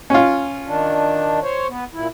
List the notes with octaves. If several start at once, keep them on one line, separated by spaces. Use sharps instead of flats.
C#4 F4
D#3 D4
C5 C#5
B3
A#2 E4